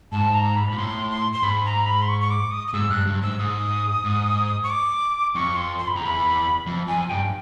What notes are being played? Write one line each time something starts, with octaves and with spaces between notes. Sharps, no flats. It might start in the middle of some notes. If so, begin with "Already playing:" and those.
G#2 A5
A#5
B5
A#2
A2 C6
C6
C6
G#2 B5
A#5
B5
C6
C#6
C#6
D6
D#6
D#6
G#2 E6
G2 F#6
G2
G#2 E6
G#2 D#6
G#2
C#6
D6
F2 C#6
C6
C6
B5
F2 A#5
E2 B5
F2
F2 G#5
G2 G5